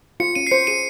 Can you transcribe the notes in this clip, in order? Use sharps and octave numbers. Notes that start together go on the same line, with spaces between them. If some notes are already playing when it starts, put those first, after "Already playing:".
F4 C#7
C#4 D#7
C7
C5 C#7
G#4 D#7